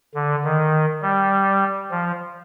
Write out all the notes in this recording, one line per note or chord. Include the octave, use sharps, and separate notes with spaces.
D3
D#3
G3
F3